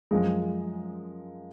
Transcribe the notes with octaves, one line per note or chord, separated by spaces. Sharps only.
F#2 F3 G#3